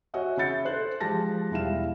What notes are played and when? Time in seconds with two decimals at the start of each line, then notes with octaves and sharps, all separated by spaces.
0.14 F#4 C#5 D#5 E5 F#5 G#5
0.37 C#3 E5 B5 G6 A6 C#7
0.65 A4 C5 F#6
1.00 F3 G#3 G4 A5 A#6
1.51 E1 G3 E4 F5 E7